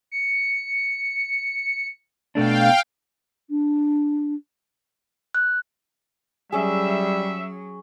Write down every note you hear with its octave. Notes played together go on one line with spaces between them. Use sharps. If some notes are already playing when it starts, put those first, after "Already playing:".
C#7
B2 A3 D4 F5 G5
D4
F#6
F#3 G3 C#4 G#4 E5